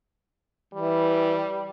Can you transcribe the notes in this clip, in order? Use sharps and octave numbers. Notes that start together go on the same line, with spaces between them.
E3 G3